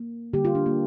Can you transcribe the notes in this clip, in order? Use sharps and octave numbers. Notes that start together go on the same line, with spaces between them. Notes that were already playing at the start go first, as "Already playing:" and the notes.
Already playing: A#3
D3 G3 A#3 G4
F4
D4
A#3